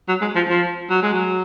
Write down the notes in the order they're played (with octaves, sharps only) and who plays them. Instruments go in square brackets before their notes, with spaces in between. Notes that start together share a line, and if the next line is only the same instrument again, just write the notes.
[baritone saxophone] F#3
G#3
F3
F3
F#3
G#3
F#3